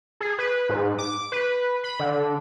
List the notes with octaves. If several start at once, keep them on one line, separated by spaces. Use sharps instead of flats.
G#4
B4
G#2
D6
B4
B5
D3